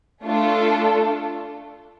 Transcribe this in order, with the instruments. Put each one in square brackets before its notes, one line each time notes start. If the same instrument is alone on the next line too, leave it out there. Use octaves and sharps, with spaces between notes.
[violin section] A3 D4 F4 A4